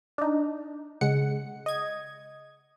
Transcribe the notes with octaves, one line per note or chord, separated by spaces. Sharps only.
D4 D#4
C#3 G#3 F#5 C#7
D#5 G#6